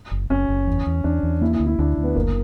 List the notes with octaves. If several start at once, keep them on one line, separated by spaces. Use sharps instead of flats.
F#1
F#1 C#4
F#1
E2
E2
E2 D4
E2
A#3 E4
E4
D2
E4
D2 D4
D2
B3
F#1 A#3